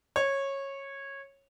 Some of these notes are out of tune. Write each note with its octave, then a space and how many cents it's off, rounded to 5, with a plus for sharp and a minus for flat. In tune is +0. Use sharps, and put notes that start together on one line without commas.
C#5 -15